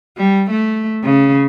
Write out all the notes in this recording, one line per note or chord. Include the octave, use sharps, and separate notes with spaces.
G3
A3
C#3